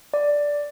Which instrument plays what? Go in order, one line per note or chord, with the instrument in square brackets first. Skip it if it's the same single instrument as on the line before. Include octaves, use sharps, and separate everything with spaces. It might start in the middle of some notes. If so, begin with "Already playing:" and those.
[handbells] D5